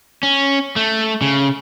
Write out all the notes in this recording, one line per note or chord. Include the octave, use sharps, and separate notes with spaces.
C#4
A3
C#3